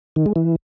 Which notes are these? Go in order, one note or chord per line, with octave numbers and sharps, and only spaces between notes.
D#3
G#3
E3